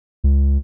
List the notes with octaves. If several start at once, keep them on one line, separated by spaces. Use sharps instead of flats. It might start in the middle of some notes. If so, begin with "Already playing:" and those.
C#2